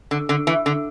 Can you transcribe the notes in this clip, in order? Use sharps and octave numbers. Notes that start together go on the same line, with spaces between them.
D3
D3
E3
D3